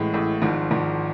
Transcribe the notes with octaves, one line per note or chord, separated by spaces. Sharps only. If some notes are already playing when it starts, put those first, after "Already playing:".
Already playing: A1 A2 G#3
A1 A2 G#3
G#1 G#2 F3
G#1 G#2 F3